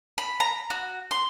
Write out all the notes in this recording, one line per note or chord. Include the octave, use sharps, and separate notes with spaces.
B5
A#5
F#4
C6